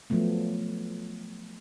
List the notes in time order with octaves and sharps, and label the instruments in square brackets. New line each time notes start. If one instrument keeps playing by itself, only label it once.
[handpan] F3 F#3 A3 B3